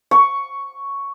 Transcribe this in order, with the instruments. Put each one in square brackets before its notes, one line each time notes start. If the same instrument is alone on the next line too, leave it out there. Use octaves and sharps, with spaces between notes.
[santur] C#6